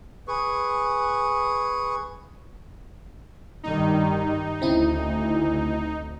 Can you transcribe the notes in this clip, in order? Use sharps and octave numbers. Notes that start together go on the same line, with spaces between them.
G#4 B4 C#6
G2 D#3 G3 D#4
D2 C#3 C4 E4